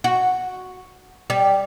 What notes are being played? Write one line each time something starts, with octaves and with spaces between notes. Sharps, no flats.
F#4
G3